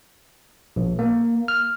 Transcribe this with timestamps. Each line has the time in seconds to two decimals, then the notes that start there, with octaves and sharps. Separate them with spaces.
0.76 A#1
0.99 A#3
1.48 F6